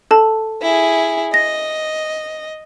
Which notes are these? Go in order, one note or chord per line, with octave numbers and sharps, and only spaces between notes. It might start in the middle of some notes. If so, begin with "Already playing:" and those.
A4 A5
E4 G#4
D#5 A#6